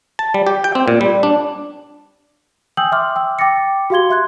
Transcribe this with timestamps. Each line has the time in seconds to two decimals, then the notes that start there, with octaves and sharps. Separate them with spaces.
0.19 A5
0.34 G3
0.47 G4
0.64 G5
0.75 C4
0.88 A#2
1.01 G3
1.23 D4
2.77 G5 G#5 D#6 E6 G6 F#7
2.92 E5 C6 D6 F6
3.16 G5 E6
3.39 G5 D6 A6 A#6 C#7
3.90 F#4 G4 F5 C6 G#6 G7
4.10 E5 C6 F#6 G#6